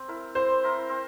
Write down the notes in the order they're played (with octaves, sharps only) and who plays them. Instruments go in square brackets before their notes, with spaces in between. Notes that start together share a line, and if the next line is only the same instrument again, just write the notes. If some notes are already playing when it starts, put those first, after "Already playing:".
Already playing: [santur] C4
E4 A#4
[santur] C4 [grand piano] C5
[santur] E4 A#4
C4